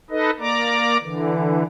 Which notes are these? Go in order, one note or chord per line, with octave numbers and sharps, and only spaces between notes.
D#4 A4 B4 D#5
A#3 D5 A#5 D6
D3 E3